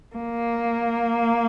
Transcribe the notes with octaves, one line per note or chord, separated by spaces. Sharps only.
A#3